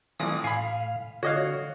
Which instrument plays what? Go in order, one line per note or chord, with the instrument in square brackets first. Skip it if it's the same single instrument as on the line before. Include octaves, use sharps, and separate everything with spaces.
[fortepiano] A1 E3 [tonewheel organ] D#6
[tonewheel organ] A2 F5 [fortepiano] G#5 B5
[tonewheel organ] D3 C#5 [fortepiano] F#4 D#5 F5